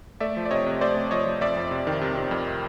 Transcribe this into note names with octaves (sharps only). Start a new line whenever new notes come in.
A3 D5 E5
F3
D5
C3 C#5 D#5
C3
A3 C5 D5
C3
F3 C#5 D#5
F3
F2 D5 E5
F2
C3
D#3
C3
C3
F2